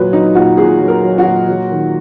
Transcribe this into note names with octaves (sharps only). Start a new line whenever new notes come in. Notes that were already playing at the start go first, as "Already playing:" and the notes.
Already playing: A#2 F#3 B4
F#3 D#4
A#2 F#4
A#2 G#4
F#3
A#4
F#3
F#4
A#2
F#3
D#3